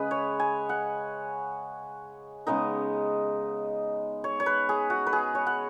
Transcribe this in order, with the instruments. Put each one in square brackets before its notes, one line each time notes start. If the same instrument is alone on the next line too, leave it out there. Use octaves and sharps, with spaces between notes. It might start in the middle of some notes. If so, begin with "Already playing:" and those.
Already playing: [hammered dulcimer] C#3 G#3 C#4 G#4 B4 D#5
C#5
G#5
F#5
C#3 G#3 B3 D#4 D#5
C#5
C#5
B4
G#4
F#4
B4
G#4
C#5
F#5